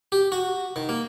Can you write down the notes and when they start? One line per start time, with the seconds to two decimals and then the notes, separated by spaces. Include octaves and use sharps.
0.12 G4
0.32 F#4
0.76 D#3
0.89 A#3